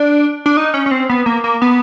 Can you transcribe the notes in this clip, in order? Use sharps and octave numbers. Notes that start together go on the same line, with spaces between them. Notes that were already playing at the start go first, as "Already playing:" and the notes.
Already playing: D4
D4
D#4
C#4
C#4
C4
B3
A#3
A#3
B3